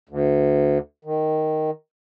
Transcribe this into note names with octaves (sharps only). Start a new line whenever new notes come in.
D2
D#3